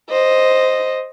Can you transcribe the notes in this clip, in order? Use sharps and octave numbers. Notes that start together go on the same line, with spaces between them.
C5 D#5